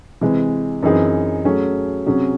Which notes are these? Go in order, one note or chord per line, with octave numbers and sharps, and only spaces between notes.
C3 E3 G#3
F#2 E3 C4 D#4 G#4
F#3 A3 C#4 G#4
C3 F#3 C#4 G#4